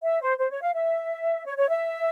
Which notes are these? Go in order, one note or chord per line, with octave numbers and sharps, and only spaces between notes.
E5
C5
C5
C#5
F5
E5
C#5
C#5
E5